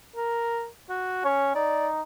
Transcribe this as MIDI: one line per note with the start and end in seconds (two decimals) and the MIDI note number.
0.16 0.66 70
0.89 1.24 66
1.25 1.53 61
1.25 1.50 73
1.55 2.02 63
1.55 1.87 74